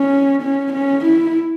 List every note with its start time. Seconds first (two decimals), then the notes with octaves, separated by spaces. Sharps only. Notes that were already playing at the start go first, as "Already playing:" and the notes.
Already playing: C#4
0.42 C#4
0.73 C#4
1.05 E4